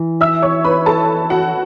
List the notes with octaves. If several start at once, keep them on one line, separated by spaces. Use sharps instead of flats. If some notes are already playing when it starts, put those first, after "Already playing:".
Already playing: E3
E5 E6
C#5 C#6
B4 B5
A4 A5
F#4 F#5